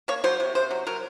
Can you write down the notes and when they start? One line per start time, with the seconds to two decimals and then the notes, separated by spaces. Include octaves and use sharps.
0.08 A#3 C#5
0.24 F#3 C5
0.40 C3
0.55 C3 C5
0.71 F#3
0.87 F#3 A#4